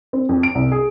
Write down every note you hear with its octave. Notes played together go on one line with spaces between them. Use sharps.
C4
F2
D7
C2
G#4